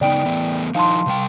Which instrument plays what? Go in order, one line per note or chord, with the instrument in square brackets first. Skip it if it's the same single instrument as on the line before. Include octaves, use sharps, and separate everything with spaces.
[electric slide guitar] C#3 B3 D#4 [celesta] D5 G5 D7
[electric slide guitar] E3 A3 B3
[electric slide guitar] F3 D#4 E4 [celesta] F5 A5 C6
[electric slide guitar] C3 G3 G5